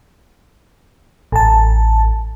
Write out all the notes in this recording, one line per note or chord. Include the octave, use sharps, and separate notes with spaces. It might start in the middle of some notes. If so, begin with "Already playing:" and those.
A1 A5